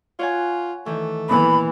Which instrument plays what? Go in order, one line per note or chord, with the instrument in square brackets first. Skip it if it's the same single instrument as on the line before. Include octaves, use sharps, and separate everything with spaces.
[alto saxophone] F4 [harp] C#5 F#5 G#5
[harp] D#3 E3 [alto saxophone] A3
[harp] A#2 B3 [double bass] E3 [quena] B5